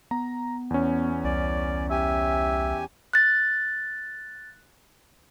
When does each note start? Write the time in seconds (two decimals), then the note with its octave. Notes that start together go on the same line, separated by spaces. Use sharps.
0.11 B3 A#5
0.70 E2 C#4
1.24 C2 D5
1.91 G4 E5 G#5
3.13 F#6 A6